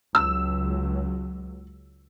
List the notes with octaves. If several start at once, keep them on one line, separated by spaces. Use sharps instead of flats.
C#2 F#3 E6